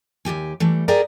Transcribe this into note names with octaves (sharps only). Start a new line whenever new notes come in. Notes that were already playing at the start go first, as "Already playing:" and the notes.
D#2 A#2 G4 G#5
E3 G3 A3
G4 G#4 A#4 D5